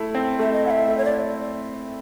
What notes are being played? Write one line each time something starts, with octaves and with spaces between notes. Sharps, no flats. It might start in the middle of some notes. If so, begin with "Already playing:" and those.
Already playing: A3 E4
C4
A3 E5
D#5
E4 F#5
E5
A3
C#5
D5